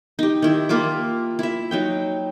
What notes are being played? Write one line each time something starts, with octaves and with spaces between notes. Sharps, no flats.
D#4 G4
D#3 E4
A#3 F4 E5 D6
E4 E5
F#3 D#4 G5